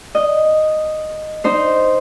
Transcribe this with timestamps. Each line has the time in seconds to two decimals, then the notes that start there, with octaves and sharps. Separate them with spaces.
0.15 D#5
1.44 D#4 C5